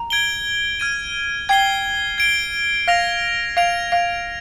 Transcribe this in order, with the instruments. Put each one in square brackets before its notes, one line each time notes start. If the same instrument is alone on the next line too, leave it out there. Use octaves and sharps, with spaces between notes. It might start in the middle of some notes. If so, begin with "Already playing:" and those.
Already playing: [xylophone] A#5
[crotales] G#6 D7 G7
F6 G#6 D#7
[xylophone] G5 [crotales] G#6 C7 G7
[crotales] G#6 D7 G7
[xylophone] F5 [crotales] F6 A#6 F7
[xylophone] F5 [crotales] G#6 D7 F7
[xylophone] F5